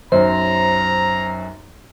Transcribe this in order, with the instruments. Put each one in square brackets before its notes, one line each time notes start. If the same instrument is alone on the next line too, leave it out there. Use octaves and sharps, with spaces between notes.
[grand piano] B1 F#2 [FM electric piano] C5 [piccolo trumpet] A#5